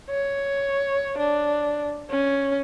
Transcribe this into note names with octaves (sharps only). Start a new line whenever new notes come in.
C#5
D4
C#4